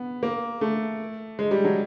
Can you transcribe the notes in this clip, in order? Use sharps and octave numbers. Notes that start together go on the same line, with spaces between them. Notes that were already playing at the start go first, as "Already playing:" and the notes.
Already playing: B3
A#3
A3
G#3
G3
F#3